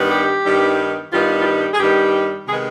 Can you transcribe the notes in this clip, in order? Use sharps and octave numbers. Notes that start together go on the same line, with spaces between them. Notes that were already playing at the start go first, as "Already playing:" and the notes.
Already playing: G2 D#3 G3 B3 D#4
G4
G2 D#3 G3 B3 D#4
G2 D#3 G3 B3 D#4 F4
F4
G4
G#4
G2 D#3 G3 B3 D#4 G4
C3 D#3 G#3 B3 G#4